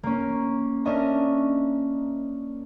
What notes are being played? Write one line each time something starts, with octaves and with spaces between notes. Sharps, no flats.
A#3 C#4
C#4 D4 A#4 D#5 E5 A#5